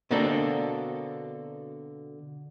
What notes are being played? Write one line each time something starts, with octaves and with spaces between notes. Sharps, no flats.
B2 D3 A#3 C4 D4 A4